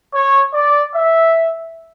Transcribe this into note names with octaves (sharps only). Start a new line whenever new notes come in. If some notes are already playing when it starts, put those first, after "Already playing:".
C#5
D5
E5